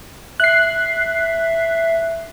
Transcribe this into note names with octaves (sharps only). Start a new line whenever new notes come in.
E5 F#6 C7